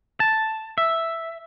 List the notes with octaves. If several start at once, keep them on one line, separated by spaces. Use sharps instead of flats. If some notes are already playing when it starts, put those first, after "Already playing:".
A5
E5